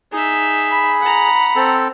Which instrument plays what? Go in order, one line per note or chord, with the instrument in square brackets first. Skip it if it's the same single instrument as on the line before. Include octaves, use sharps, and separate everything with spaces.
[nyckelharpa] D#4 E5 [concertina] G#4
[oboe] B5
[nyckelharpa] F#5 A#5
[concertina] C4 A4